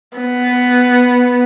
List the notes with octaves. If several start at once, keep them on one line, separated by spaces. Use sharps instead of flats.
B3